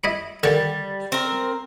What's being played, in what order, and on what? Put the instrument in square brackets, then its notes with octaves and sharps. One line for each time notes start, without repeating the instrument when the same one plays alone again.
[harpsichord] E4 D#5 B5
[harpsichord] D3 D#3 [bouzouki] G3
[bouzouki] C4 A#4